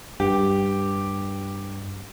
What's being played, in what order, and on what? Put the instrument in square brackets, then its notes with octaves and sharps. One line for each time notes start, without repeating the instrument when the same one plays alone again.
[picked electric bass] G2 [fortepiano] G4